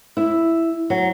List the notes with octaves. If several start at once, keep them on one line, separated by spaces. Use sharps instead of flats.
E4
F#3